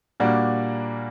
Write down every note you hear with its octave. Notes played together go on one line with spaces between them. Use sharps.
A#2 G3 A#3 D4 F#4